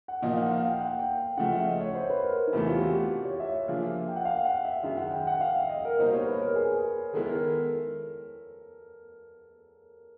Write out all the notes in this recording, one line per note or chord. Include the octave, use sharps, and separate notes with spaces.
F#5
A#2 F3 A#3 D#4
F#5
F5
G5
F#5
G5
C#3 F3 A3 F#5
E5
D#5
C#5
C5
B4
A#4
D#4
E2 C3 E3 A3 E4
F4
G4
F#4
F#4
G4
C#5
E5
E5
F3 A#3 D4 F4 G#4
G5
F#5
F5
F#5
E5
F#2 D#3 G#3 E5
F#5
G5
F#5
F5
E5
D#5
A#4
B2 G3 A#3 D#4 C5
C#5
B4
A#4
G#4
D#3 G#3 B3 E4 A4
A#4